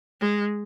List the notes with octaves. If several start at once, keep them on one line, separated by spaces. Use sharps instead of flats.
G#3